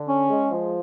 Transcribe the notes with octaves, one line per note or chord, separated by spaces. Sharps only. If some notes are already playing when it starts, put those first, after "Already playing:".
Already playing: D3
C#4
G#3
F3